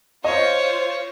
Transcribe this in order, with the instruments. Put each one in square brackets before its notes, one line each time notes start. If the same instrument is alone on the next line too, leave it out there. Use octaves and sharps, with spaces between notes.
[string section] F4 C5 [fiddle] C#5 [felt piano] D#5